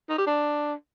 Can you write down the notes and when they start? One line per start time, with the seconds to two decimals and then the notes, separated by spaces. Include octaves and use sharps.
0.09 D#4
0.18 G4
0.27 D4